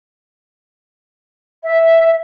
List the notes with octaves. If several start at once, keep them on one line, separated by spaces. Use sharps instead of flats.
E5